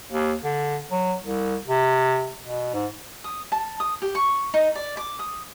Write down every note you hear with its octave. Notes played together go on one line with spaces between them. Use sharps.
D#2
D3
F#3
C2
C3
B2
G#2
D#6
A5
D#6
G4
C#6
D#4
D5
D6
D#6